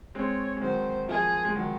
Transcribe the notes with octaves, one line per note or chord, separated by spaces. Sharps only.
G#3 C4 C#5
G#3
D#3 F#3 C5
F3 G#4
G#3
D#3 F#3